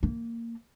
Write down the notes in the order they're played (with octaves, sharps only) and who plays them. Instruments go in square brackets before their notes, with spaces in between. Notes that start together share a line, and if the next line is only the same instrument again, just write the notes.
[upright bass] A#3